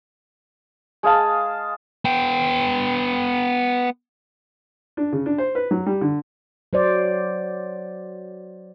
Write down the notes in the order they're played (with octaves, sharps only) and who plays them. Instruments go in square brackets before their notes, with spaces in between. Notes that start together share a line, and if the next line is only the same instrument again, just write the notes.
[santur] G#3 G#4 F5 A5
[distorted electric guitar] B3 G5
[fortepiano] D4
C#3
D4
C5
B4
F#3
G3
D3
[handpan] F#3 C5 D5